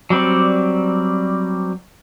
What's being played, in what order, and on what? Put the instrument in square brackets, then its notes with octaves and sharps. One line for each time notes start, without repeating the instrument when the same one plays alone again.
[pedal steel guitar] F#3 G3 C4 D5